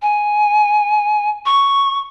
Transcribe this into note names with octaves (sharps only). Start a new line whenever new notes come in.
G#5
C#6